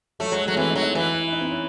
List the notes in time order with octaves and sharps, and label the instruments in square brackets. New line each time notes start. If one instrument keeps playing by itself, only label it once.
[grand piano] F#3 [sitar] A3
[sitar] F#3 [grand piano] G#3
[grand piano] A3
[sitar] F#3
[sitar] E3 [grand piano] C4
[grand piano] D#4
[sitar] F#3
[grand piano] E4
[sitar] E3
[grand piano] E4
D#4
C4
C#4